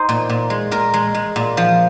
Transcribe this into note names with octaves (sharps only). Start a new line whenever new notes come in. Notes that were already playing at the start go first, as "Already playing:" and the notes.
Already playing: D#4 C5
A#2
A#2
G#3
A#2 A#4
G#3
G#3
A#2
F3